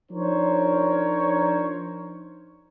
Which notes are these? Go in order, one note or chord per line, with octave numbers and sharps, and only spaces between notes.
F3 D4 D#4 A#4 C5 C#5